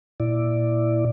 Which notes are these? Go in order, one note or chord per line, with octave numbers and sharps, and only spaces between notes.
A#2 E4 D5